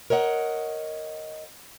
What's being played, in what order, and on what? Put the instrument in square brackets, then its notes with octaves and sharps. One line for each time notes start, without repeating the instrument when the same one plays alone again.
[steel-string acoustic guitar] A#4 C#5 D#5 F#5